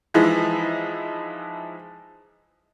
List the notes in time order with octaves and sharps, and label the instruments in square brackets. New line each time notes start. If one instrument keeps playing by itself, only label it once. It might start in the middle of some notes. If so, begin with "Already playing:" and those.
[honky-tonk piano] E3 F3 G#3 D#4 E4